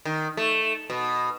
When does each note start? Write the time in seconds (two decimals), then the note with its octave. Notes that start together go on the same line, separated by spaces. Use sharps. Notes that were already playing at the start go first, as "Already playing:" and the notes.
0.05 D#3
0.37 A3
0.90 B2